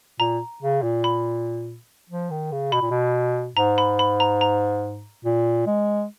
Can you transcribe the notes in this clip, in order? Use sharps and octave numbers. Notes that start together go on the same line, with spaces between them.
A#2 A#5
C#3
A#2
B5
F3
D#3
C#3
B2 B5
A#2
B2
G#2 A#5
B5
B5
A#5
A#5
A#2
G#3